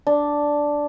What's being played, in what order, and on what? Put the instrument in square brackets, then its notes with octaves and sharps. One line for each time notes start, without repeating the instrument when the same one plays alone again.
[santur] D4